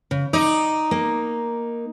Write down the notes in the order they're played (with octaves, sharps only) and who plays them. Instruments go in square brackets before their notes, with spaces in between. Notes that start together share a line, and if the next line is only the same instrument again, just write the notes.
[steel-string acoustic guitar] C#3
[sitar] D#4 [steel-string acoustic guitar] D5
[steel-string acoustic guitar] A#3